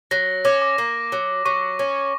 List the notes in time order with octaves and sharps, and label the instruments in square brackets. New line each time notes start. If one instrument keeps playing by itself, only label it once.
[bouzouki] F#3 [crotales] A#6
[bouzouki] C#4 [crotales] D6
[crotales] D6
[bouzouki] A#3
F#3
[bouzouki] F#3 [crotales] C#6
[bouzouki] C#4